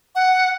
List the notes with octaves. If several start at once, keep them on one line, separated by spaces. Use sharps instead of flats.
F#5